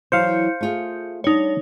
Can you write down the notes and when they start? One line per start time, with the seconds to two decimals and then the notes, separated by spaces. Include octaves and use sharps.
0.12 E3 F#3 C5 F5 G6 C#7
0.61 A3 F4 G#4
1.24 G3 D4 D#4 C#5